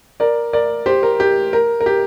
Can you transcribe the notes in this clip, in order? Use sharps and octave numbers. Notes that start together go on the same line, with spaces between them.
A#4 D5
A#4 D5
G4 C5
A#4
G4
A#4
A#4
G4